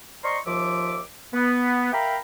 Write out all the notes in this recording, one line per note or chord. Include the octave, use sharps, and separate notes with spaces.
C5 D5 D#5 A#5 C6 C#6
D#2 F3 F4 E5 D6
B3
A#4 E5 F5 G5 A#5 B5